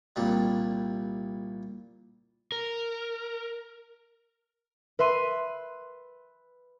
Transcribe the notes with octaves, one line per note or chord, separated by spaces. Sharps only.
C2 A#2 G3
A#4
B4 E5 C6 D#7